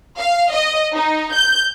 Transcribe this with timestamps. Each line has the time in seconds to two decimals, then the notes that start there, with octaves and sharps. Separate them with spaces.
0.18 F5
0.53 D#5
0.94 D#4
1.34 G6